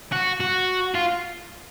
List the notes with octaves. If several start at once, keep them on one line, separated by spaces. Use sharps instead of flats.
F#4
F#4
F4